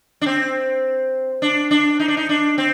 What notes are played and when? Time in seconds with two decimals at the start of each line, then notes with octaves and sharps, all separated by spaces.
0.21 D4
0.26 C4
1.42 D4
1.71 D4
1.99 D#4
2.08 D4
2.17 D#4
2.29 D4
2.58 C4